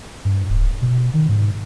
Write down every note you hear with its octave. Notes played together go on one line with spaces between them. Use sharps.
G2
D1
B2
D#3
G#2